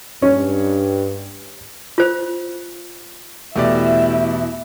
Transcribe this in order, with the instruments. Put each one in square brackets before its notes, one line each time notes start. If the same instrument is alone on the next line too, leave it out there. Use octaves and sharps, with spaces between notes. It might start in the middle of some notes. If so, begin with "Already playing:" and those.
[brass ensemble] G2 [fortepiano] C#4
[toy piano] F4 C5
[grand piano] E2 B2 [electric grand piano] A3 G4 D5 [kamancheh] E4 E5